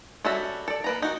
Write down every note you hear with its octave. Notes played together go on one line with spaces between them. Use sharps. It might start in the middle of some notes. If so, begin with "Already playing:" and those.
G3 C#4 F#4 A4 E5
A4 D5
A#3 B4 A#5
D#4 F#4